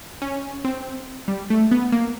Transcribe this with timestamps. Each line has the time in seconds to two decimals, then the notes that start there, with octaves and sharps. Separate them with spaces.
0.22 C#4
0.65 C4
1.28 G3
1.50 A3
1.71 B3
1.92 A#3